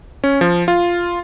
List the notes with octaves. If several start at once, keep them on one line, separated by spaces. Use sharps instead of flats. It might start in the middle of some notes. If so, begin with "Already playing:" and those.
C#4
F3
F4